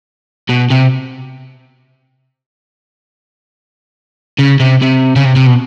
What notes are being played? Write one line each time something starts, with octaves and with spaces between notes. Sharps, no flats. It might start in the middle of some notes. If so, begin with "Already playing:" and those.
B2
C3
C#3
C3
C3
C#3
C3
C3
B2